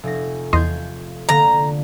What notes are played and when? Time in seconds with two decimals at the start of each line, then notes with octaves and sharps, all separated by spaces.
0.03 F1 A#6
0.53 E2 F4 D#5 C6 G6 G#6
1.29 D3 A#3 A#5